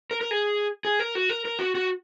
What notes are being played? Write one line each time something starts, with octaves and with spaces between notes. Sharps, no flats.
A#4
A#4
G#4
G#4
A#4
F#4
A#4
A#4
F#4
F#4